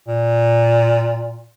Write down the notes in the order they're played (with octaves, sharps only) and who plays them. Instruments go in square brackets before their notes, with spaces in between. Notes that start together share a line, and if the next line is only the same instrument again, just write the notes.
[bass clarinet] A#2